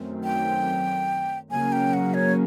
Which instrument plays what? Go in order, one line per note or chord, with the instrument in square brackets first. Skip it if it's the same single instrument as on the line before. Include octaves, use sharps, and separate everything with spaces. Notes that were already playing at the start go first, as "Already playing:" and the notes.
Already playing: [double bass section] F#2 D#3 F#3 A3 C4
[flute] G5
[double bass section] C#3 F#3 A#3 C#4 [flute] G#5
[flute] G5
F#5
C#5